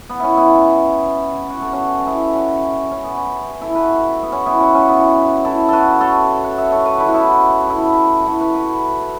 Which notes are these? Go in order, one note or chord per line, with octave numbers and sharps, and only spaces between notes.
B3
C#4 E4
B3 E4
F#4
A4
C#4 F#4
B3 E4
C#4
C#4
C#4
B3
C#4
E4 A4
F#4 B4
B3
C#4
B3 E4
C#4 F#4
C#4
B3 E4
E4 A4
F#4 A4 B4
A4 C#5
F#5
E5
A4 C#5
F#4 B4
E4 A4
F#4
B3 E4
E4 A4
F#4
E4 A4
F#4 B4
F#4 B4